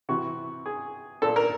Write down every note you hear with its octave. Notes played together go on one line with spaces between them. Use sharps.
C3 E3 F#4
G#4
A#2 A4
A#4